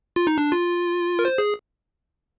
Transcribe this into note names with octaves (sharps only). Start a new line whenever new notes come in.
F4
D#4
D4
F4
A#4
C5
G#4